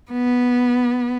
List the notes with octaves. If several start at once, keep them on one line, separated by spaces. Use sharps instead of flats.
B3